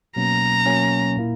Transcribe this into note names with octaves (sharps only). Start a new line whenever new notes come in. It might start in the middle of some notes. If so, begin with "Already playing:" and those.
B2 F#3 A#3 C#4 A#5
B2 F#3 A#3 C#4
A#2 A#3 E4